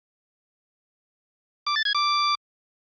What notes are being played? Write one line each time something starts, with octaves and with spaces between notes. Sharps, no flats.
D6
A6
G#6
D6